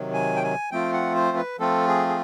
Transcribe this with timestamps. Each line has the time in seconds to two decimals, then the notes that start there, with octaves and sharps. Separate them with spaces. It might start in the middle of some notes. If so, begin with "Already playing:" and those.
Already playing: C3 D#3 F#3
0.13 G#5
0.36 G5
0.44 G#5
0.71 F3 A3 C4 F4 G5
0.93 F#5
1.15 C5
1.37 B4
1.59 F3 A3 C4 F4 A4
1.88 G#4
2.08 G#4